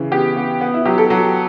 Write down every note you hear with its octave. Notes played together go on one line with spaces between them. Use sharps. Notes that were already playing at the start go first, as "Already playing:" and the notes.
Already playing: C#3 E3
B3 G4
B3
B3
E4
F#3 G4
A4
F#3